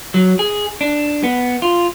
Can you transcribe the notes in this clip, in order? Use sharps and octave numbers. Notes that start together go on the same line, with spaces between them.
F#3
G#4
D4
B3
F4